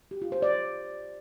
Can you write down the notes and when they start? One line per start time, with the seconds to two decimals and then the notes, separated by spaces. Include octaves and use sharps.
0.11 G4
0.22 F4
0.32 C5
0.42 D5